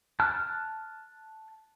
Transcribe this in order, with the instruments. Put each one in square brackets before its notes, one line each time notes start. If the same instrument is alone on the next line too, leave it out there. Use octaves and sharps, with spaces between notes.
[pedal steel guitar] A5 F6 F#6